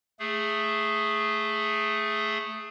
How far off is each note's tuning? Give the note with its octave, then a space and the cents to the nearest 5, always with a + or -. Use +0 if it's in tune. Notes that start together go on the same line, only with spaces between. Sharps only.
A3 +0 G#4 +0